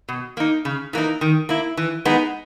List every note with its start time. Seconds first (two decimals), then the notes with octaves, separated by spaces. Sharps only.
0.08 B2
0.37 A#3 D#4
0.65 C#3
0.93 E3 A#3 D#4
1.21 D#3
1.49 A#3 E4
1.77 E3
2.05 G#3 B3 D#4